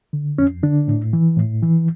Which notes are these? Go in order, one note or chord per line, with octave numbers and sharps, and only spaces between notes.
D3
F2 C#4
D3 D4
A2
E3
A2
E3